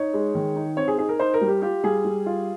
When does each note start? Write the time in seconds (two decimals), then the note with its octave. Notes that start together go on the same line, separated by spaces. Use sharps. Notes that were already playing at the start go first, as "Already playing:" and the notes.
Already playing: D#4 C#5
0.14 G#3
0.35 D#3
0.56 D#4
0.77 C4 C#5
0.88 G#4
0.98 D#4 G#4
1.09 A#4
1.19 D#4 C5
1.34 A#4
1.41 G3
1.48 G4
1.62 F4 G4
1.84 G3 G#4
2.05 G3
2.26 F4